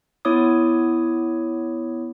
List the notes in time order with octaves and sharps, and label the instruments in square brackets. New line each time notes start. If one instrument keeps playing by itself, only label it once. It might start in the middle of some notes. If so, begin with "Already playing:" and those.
[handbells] B3 E4 C#5 D6 D#6